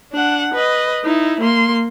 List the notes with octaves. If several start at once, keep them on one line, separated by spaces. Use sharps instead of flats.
D4 F#5
B4 D#5
D#4 E4
A#3 C6